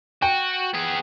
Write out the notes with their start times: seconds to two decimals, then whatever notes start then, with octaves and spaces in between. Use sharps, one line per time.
0.22 F#4 G5
0.74 B3 G#4